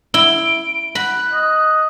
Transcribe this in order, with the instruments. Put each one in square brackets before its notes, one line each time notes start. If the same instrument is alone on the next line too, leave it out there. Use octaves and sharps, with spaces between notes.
[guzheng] E4 [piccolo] D7 [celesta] G7
[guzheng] B5 [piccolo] F#6
[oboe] D#5